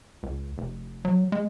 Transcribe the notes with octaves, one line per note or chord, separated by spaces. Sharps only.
C#2
F1
F#3
G#3